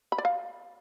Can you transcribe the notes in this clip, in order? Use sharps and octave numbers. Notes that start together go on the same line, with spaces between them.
B5
D5
F5